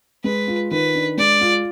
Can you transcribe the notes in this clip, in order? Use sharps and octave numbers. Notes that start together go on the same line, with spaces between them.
G#3 B4
F4
D#3 B4
D4
G#3 D5
F4